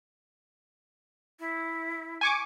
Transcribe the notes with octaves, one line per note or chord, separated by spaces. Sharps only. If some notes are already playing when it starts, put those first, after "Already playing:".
E4
G#5 C#6 D6